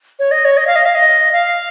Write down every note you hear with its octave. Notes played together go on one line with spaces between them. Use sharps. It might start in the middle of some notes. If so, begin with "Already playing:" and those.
C#5
D#5
C#5
D#5
F5
D#5
F5
D#5
F5